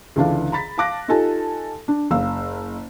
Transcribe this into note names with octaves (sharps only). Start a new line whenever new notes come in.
C#2 D3 E3 D4 F5
A#5 B5 A6 B6
F5 A5 D6 F#6 A#6
D#4 F4 G4 A4 G#5 A5
D4
F#1 F5 E6